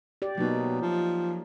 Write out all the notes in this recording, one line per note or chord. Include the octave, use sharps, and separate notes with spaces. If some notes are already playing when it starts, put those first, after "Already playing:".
G4 D5
B2 F#3 A#3 D#4
F3